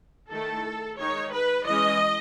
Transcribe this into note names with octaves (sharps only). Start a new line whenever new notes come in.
D#3 A3 E4 A4
D#3 G#3 D#4 C#5
B4
E3 G#3 C#4 D#5